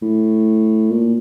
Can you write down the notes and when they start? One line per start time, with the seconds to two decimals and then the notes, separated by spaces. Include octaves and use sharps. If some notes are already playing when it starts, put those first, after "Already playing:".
0.02 A2
0.91 A#2